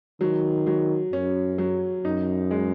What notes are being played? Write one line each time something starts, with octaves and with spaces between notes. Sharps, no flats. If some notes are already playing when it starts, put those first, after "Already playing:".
D#3 F#3
F#3
F#2 C#4
F#3
F#2 D#4
G#3